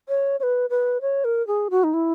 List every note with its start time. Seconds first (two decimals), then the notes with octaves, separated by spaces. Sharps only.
0.08 C#5
0.40 C#5
0.43 B4
0.70 B4
1.01 C#5
1.24 A#4
1.47 G#4
1.70 F#4
1.84 D#4
1.93 E4